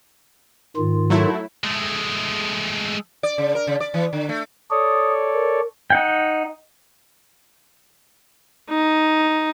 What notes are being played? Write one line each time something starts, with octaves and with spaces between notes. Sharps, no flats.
G#2 D#3 F4
F#3 A3 E4
G#3 A3
D5
C#3
A#4
C#3
D5
E3
D3
A3
A4 C#5 D5 D#6
A#4
D#4 F#5 G5
D#4